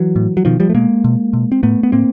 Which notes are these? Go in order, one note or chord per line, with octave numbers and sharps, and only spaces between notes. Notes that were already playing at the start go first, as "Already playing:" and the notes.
Already playing: E3 F#3
A2
F#3
B2 D#3 F3
F3 G3
A3
B2 G#3 A#3
B2
B2
C4
A2 A3 B3
B3
A2 A#3 C4